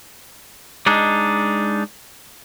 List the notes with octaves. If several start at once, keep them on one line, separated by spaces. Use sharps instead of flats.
G#3 D4 D#4